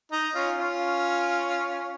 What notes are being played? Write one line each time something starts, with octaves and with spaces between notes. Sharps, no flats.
D#4
C#4 F4
C#4 F4